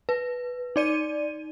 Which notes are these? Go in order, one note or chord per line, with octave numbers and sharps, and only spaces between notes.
B4
D#4 D5 D#7